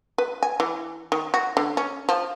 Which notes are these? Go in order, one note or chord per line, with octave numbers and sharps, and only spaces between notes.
B4
G#5
E3
D#3
F#4
D3
C#4
F3